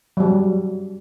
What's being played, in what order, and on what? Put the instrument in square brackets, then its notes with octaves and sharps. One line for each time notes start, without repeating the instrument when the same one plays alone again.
[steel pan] F#3 G3